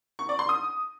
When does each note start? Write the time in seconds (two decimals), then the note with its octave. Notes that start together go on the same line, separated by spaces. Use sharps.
0.19 C#6
0.29 D5
0.39 C6
0.49 D#6